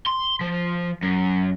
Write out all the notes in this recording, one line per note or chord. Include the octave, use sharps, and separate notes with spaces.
C6
F3
F#2